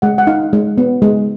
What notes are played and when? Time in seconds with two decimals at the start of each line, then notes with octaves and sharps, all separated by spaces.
0.02 G#3 F#5
0.18 F#5
0.27 D#4 F5
0.53 G#3
0.78 B3
1.02 G#3